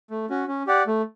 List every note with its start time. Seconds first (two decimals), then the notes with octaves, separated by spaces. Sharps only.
0.10 A3
0.30 C#4 F#4
0.48 C#4
0.67 G4 D5 F#5
0.87 A3